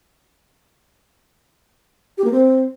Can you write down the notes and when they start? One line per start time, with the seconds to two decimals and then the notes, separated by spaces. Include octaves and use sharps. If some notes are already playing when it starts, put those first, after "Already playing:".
2.18 G4
2.25 A#3
2.31 C4